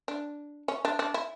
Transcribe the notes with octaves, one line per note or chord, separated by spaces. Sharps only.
D4
C#4
D4
D4
E4